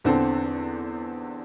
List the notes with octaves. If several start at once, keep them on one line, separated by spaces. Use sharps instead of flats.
E2 D3 C4 A4